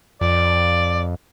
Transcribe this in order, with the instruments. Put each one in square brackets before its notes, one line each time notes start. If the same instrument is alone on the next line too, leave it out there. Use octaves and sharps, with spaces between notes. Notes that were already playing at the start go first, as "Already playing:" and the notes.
[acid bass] F2 [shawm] D5